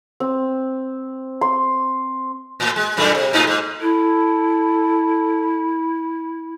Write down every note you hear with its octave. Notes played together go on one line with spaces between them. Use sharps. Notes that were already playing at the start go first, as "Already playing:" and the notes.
C4
C6
A2
G#3
F#2 A#2 A3
C3
A2 D#4 F4
G#2
E4 A4